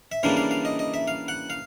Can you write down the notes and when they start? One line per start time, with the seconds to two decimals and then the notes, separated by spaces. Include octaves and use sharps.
0.12 E5
0.23 C#3 E3 G3 A#3 D4 F5
0.37 F5
0.51 F5
0.65 D#5
0.79 D#5
0.94 E5
1.08 F5
1.28 F#5
1.50 F5